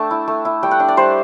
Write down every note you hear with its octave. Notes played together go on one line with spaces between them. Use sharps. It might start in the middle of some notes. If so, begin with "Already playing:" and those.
Already playing: A3 D4 G5 A5
E4
A3
E4
G3 G5
F#5
D4
D5
G3 C5